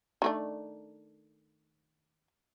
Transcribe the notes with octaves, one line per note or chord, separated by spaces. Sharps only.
D#3 A3 D4